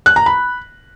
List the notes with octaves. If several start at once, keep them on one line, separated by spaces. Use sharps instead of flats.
F#6
A#5
B5